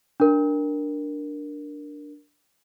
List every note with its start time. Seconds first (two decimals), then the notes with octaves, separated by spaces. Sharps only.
0.20 D4 A#4